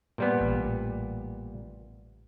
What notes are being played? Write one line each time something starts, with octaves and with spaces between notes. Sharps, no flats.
A#2 G3 B3
A1